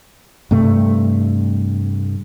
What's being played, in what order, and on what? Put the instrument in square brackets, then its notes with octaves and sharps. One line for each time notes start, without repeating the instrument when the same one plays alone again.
[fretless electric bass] G2 C3 A3